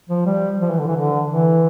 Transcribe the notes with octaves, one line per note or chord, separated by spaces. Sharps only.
F3
G3
F3
E3
D3
E3
D3
E3